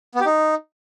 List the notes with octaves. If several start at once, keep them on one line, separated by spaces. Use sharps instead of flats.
B3
G4
D#4